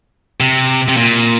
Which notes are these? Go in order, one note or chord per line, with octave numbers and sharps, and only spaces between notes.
C3
C3
A#2